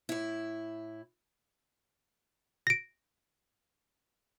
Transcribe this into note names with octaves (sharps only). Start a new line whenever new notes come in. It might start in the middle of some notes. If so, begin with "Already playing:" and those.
A2 E4
A#6 D7